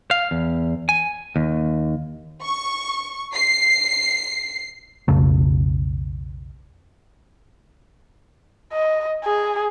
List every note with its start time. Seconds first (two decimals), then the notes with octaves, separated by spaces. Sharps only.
0.11 F5
0.31 E2
0.89 G#5
1.36 D#2
2.43 C#6
3.34 C7
5.08 B1 F2 C#3 A3
8.73 D#5
9.25 G#4